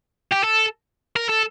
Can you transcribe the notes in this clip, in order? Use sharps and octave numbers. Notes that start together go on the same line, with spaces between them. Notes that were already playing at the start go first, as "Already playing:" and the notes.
G4
A4
A#4
A4